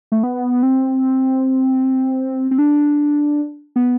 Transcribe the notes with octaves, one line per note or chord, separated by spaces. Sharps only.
A3
B3
C4
C4
D4
B3